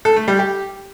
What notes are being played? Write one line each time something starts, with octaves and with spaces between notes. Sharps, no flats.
A4
A3
G3
G4